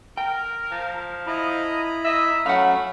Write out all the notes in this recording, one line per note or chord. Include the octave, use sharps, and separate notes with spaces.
A#4 G5
F3
E4 D#5 A#5 B5
D#5 E5
F#3 A3 C#4 F5 F#5 B5